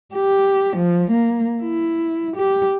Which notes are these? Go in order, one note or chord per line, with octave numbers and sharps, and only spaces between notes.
G4
F3
A#3
E4
G4